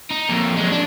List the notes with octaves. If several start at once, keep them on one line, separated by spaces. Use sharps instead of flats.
D#4
F2 A#3
F#3 G#3
D4